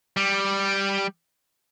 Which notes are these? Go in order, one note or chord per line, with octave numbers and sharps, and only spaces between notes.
G3